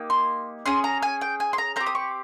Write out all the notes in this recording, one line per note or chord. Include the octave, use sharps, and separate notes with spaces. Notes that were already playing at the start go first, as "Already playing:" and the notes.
Already playing: A#3 D#4 G4
C6
C#4 G#4 C6
A#5
G#5
G5
G#5
C6
A#5
C4 G4 A#5
D#6
C#6